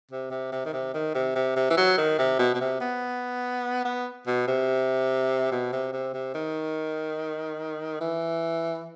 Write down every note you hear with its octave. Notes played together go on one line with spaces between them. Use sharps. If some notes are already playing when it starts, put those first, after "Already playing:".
C3
C3
C3
D#3
C3
D#3
C3
C3
C3
E3
F#3
D#3
C3
B2
B2
C3
B3
B3
B2
C3
B2
C3
C3
C3
D#3
E3